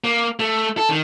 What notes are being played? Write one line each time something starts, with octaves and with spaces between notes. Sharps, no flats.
A#3
A3
A4
D#3